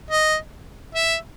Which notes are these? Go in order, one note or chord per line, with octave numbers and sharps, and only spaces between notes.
D#5
E5